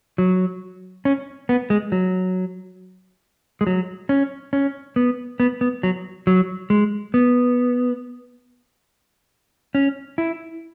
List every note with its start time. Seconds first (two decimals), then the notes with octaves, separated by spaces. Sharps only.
0.18 F#3
1.05 C#4
1.49 B3
1.70 G#3
1.92 F#3
3.61 G#3
3.67 F#3
4.09 C#4
4.53 C#4
4.96 B3
5.40 B3
5.61 B3
5.83 F#3
6.27 F#3
6.70 G#3
7.14 B3
9.75 C#4
10.18 E4